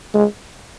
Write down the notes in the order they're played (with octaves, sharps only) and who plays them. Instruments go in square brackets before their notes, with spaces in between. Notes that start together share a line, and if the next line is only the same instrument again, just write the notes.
[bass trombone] G#3